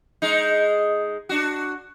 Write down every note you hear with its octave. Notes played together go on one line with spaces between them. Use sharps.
G#3 D#4
D4 F#4